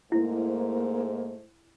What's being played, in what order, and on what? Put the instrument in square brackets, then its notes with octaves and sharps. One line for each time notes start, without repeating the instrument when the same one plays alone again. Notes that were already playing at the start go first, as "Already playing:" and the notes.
[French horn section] G#2 A3 C5 [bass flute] A#3 [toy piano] E4